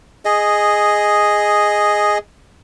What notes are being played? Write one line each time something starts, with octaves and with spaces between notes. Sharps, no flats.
G#4 D#5